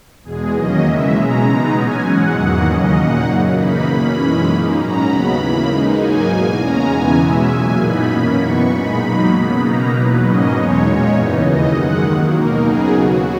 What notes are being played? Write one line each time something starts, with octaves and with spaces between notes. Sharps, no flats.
E2 B2 G#3 G#4
D#2 D#3 F#3 A#3 C#4 D#5
C#3 E3 G#3 E5
B2 G#3 C#4 A#5
B2 G#3 B3 D#4
A#2 F#3 C#4 G#5
G#2 E3 G#3 F#5
E2 D#3 F#3 A#3
D#2 C#3 F#3 C#4 D#5
A#2 A#3 D#4 F#5
F#2 C#3 F#3
C#3 E3 A#3 D#4 B5
B2 A#3 C#4 B5
F#2 E3 G#3 C#4
A#2 A#3 D#4
G#2 F#3 C#4 A#5
D#2 C#3 F#3 B3 B5
C#3 E3 A#3
C#3 G#3 D#4
G#2 F#3 A#3 D#4 G#5
E2 B2 A#3
C#3 G#3 C#4 A#5
E2 C#3 E3 B3 G#5
B2 G#3 C#4 E5
A#2 F#3 A#3 G#5
F#2 C#3 E3 B3 D#4 B5
B2 A#3 C#4
F#2 E3 B3 D#4 C#6
A#2 G#3 D#4 B5
B2 F#3 A#3 D#4 B5
C#3 F#3 B3 B5
B2 A#3 D#4 A#5
E2 B2 F#3 B4
G#2 F#3 A#3 C#4 D#5
E2 B2 G#3 D#4 C#5
A#2 G#3 C#4
F#2 C#3 E3 B3 D#4
D#2 C#3 E3 D#5
F#2 D#3 G#3 F#5
D#2 D#3 F#3 A#3
B2 A#3 D#4 A#4
C#3 F#3 B3 D#4 G#4
D#2 C#3 F#3 F#4